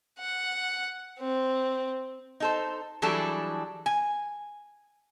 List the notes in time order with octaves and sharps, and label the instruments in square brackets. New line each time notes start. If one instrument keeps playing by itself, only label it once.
[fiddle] F#5
C4
[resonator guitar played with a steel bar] D#4 A4 C5
E3 F#3 G3 D4 G#4 A4
G#5